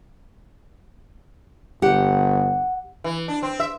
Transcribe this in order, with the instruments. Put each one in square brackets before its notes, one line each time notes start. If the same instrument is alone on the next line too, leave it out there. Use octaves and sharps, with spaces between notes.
[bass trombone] G1 [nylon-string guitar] G4 [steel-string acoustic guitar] F#5
[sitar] E3
D4
C4
E5